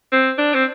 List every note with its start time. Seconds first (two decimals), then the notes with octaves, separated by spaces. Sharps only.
0.12 C4
0.38 D4
0.54 C4